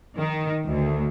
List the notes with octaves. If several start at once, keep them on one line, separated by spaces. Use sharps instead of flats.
D#3
D2